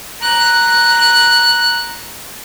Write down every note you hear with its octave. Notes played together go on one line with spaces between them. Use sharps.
A#5 F#6